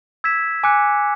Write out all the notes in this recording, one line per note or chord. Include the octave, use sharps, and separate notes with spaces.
E6 G#6 B6 E7
G#5 D6 F#6 C#7